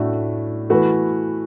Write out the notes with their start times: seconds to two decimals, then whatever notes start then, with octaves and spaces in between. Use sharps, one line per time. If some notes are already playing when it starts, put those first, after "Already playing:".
Already playing: A2 A3 D4 F#4 A4
0.70 E3 A3 F#4 B4